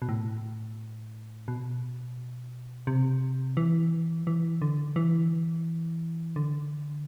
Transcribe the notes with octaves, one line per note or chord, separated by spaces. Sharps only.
B2
A2
B2
C3
E3
E3
D3
E3
D3